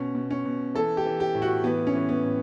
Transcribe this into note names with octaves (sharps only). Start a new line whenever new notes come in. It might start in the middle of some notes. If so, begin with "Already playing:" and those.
Already playing: B2 C#4
B2
C#4
B2
E3 A4
G4
E3
G4
A2
F#4
E3 B3
C#4
E3
B3
A2